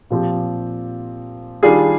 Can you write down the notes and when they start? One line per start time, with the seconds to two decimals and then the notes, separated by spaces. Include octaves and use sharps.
0.10 A#2 F3 C4 G4
1.63 D#3 G3 D4 F4 G#4